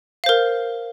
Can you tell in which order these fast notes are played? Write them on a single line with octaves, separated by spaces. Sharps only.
F5 C5 A#4